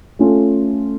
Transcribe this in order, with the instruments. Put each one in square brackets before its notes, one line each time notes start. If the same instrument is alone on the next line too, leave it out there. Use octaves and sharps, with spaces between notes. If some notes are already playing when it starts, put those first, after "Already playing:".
[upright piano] A3 C#4 F4 A4